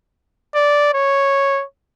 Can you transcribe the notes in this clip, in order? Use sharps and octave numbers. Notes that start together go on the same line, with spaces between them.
D5
C#5